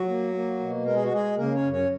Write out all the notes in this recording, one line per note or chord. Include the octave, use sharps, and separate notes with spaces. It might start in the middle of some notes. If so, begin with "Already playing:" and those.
Already playing: F#3 F#4
A#3
A#3
B2
G#3 A#4
G#4
F#4
G#3 G#4
C#3 A#3 A#4
C#4 C#5
F#2
C#4 C#5